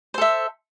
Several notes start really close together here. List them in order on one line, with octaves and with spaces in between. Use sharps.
C5 A4 E5